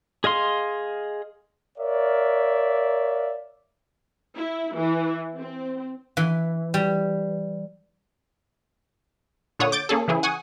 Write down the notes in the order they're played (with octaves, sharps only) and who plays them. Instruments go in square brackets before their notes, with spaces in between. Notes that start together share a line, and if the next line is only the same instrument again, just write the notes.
[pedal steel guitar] G#4 D#5 F5 C6
[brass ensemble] A#4 C#5 D5 E5 F5
[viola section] E4
E3
C4
[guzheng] E3
G3
[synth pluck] A#2 D3 C#5 F#5 D#6
D6 G6 A6 D7
A#3 C#4 G#4 A4
C#3 E3 E4 G#4
F#5 G#5 C#6 D#6